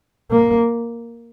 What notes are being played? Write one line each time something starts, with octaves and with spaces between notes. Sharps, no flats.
A#3